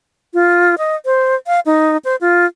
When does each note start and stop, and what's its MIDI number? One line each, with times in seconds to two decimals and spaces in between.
0.34 0.75 65
0.78 0.96 75
1.05 1.36 72
1.47 1.60 77
1.66 1.97 63
2.05 2.16 72
2.21 2.46 65